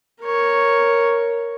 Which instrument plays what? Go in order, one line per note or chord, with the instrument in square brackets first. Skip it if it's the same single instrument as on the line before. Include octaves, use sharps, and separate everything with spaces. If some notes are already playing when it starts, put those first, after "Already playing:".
[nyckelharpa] A#4 C#5